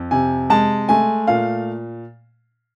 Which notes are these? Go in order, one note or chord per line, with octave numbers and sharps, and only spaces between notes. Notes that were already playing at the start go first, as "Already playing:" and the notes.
Already playing: F2
C3 G#5
G#3 A5
A3 G#5
A#2 F5